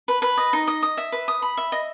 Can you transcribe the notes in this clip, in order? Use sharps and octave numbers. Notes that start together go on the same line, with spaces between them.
B4
B4
D#5
D#4
D#5
D#6
E5
B4
D#6
B5
E5
D#5